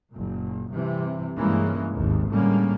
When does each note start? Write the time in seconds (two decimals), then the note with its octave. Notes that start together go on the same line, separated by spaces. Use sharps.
0.11 F#1 A#2
0.72 G2 C3 E3
1.36 G2 E3 G#3 A#3 C#4
1.94 G#1 D#2
2.29 A2 D3 G3 G#3 A#3 C#4